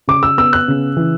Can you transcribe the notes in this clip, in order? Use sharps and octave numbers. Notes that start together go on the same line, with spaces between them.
C#3 D6
E6
B3 E6
F#6
C#3
E3